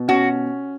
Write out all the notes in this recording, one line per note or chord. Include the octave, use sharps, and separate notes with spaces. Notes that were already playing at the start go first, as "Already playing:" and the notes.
Already playing: B2
C#4 F#4